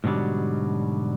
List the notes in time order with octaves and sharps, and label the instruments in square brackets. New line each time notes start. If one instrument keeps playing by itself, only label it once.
[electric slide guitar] G#2 B2 D3 F#3 G3